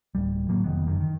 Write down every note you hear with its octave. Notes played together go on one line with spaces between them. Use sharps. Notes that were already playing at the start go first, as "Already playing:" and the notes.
D1 G3
A2 D3 F#3 A#3
F1 C#2 D#3 B3
F#2 D3 D#3
D#3